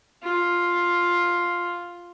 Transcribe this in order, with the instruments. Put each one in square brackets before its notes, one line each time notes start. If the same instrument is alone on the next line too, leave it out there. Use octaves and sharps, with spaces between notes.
[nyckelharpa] F4